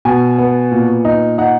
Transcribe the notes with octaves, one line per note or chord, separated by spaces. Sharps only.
B2 G#5
B3
A#2
D#4
D#4 F#5